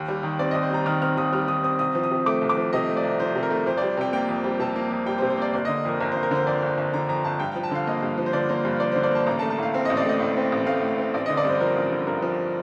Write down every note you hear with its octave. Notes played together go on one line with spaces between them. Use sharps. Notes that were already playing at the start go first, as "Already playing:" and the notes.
Already playing: D#2
G3
D#3
C4 D5
D#2 D#5
C5
G3 A#5
D#3 F6
C4 F6
D#2 D#6
G3 F6
D#3 D#6
C4 D#6
C2 D#6
F3
D#6
C3
A3 D6
C2
D6
F3
C3 D#5
A3
D5
C2
F3 C5
C3
A#4
A3
F2 C5
G3 D5
C3 G5
A#3 G5
F2
G3
C3 A5
A#3
F2
G3 G5
C5
C3
C5
A#3 D5
G1 D5
D3 D#5
F2 A#4
G1 A#4
G1 C5
A#4
D3 C5
F2 D5
G1
G1
D3 A#5
F2 A#5
G1 A5
G2 G5
F3 G5
A5
D3 F5
A#3 D#5
G2
F3
C5
D3 D5
A#3 C5
G2
F3 D5
D3 C5
D5
A#3 A5
A1 A#5
A5
A3
A5
A2 F5
C4 F5
A1 D#5
D5
A3 D#5
A2
C4
A1
A3 F5
A2
C4
A1 D5
D3 D#5
D5
G2 C5
F3 A#4
A1
D3
G2 A#4
F3